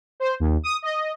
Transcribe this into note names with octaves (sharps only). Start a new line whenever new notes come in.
C5
D#2
D#6
D#5